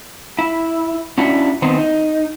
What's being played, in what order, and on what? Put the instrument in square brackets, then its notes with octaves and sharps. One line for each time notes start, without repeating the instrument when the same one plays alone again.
[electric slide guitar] E4
C#4 D4 E4 F#4
D#3 B3 C4
D#4